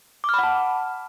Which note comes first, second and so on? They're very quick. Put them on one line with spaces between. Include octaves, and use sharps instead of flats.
D6 F6 B5 F#5 A5